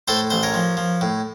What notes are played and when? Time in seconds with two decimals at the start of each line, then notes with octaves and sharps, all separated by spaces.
0.08 A2 A4 C5
0.30 A1 C5
0.43 A#4 C#5
0.54 F3
0.77 F3
1.01 A2